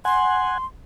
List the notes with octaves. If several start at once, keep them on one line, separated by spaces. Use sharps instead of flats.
F#5 G#5 C6